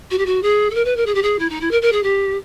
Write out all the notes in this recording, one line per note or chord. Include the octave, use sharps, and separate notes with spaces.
F#4
G4
F#4
G#4
A4
A#4
B4
A#4
G#4
G4
G#4
E4
D#4
E4
A#4
A#4
G#4
G4